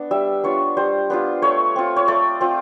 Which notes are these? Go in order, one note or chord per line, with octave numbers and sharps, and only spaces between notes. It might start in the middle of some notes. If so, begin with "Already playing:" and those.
Already playing: B3 D4
G3 E5
B3 D4 F4 C#5
G3 C5
B3 D4 F4
A3 C#5
C4 F4
C#5
A3 D5
C4 F4